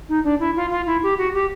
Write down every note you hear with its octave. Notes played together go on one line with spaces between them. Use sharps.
D#4
D4
E4
F4
F4
E4
G4
F#4
G4